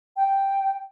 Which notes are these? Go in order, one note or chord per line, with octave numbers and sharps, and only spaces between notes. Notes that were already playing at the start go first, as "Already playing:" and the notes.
G5